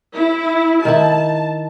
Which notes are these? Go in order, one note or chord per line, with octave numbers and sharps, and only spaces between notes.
E4
D#3 E4 A5